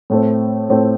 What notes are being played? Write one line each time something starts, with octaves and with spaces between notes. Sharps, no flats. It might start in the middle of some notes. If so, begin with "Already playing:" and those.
A2 A3 C4
A2 A3 C4